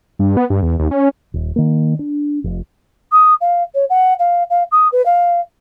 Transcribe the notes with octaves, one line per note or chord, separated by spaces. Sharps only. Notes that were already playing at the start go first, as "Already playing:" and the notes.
G2
B3
G2
E2
D#2
C#4
D#1
D#3 A#3
D4
F1 F2
D#6
F5
C#5
F#5
F5
F5
D#6
B4
F5